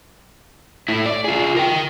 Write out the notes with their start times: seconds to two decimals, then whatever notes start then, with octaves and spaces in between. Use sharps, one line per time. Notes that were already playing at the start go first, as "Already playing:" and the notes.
0.89 A3 E4
1.06 D5
1.24 F4 G#4
1.57 A#4 G5